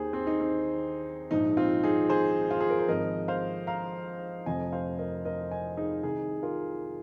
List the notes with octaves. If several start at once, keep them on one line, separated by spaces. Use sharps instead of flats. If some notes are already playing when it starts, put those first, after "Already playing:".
Already playing: D#2 D#3 G#4 C5
C4
D#4
C4
A#1 G#2 F3 D#4
C4 F4
D#4 G#4
G#4 C5
F4
G#4
A#4
C5
G#1 G#2 F3 A#4 D#5
C5 F5
F5 A#5
F1 F2 F3 D#5 G#5
C5 F5
A#4 D#5
A#4 D#5
D#5 G#5
D#4 G#4
C2 C3 D#3 D#4 G#4
F4 A#4